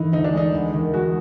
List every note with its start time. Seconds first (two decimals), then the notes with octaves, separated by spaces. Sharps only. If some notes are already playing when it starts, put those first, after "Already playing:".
Already playing: G1 E3 D#4
0.12 D2 D#4
0.24 D4
0.33 G#3 D#4
0.52 E2
0.73 D#3
0.94 G#3 F#4